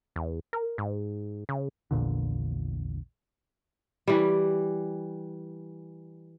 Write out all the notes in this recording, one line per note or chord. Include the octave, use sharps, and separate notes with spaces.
E2
A#4
G#2
C#3
A#1 E2 A#2 D3
E3 G3